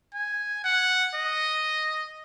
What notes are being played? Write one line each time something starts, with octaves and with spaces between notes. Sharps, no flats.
G#5
F#5
D#5